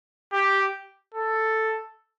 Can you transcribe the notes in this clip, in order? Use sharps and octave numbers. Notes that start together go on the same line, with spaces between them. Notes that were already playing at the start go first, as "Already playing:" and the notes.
G4
A4